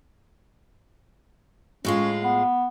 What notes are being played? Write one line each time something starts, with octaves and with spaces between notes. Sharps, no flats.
A2 G#3 C#4 F4
B3